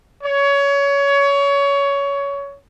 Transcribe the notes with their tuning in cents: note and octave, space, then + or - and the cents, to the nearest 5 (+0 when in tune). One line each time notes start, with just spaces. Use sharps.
C#5 +20